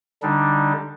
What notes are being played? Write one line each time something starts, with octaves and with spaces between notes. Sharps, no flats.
D3 G3 D4 D#4